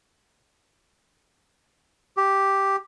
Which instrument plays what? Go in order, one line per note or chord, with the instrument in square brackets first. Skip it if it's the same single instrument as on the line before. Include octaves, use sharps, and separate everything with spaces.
[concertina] G4